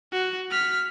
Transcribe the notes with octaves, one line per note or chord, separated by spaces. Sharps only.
F#4
F6 B6